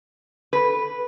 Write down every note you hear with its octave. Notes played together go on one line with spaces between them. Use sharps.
B4